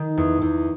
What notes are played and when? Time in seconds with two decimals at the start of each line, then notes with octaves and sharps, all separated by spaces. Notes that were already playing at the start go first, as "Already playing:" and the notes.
Already playing: D#3
0.17 E2
0.42 E2